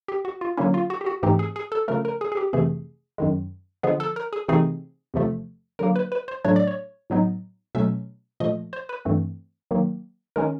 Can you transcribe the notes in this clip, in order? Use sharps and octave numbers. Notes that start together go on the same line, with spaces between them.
G4
F#4
F4
D3 F#3 A#3 C#4 E4
F4
F#4
G4
F#4
G#2 E3 A3 C4 D#4 G4
G#4
G#4
A4
C#3 F3 A3 A#4
A#4
G#4
G#4
G4
F2 C3 E3 A3 G#4
F#2 D#3 G#3
D3 F3 G#3 B3 G#4
A4
A#4
G#4
C3 E3 A3 C4 D#4 G#4
E2 C3 F3 A3
D3 F#3 A#3 A#4
B4
B4
C5
A2 F#3 A3 D4 C#5
D5
C#5
A2 F#3 B3 D#4
B2 F#3 A3 C#4 E5
A#2 F3 A3 D#5
C5
B4
G2 E3 A3 C4
D#3 F#3 A#3
D#3 G#3 C#4 A#4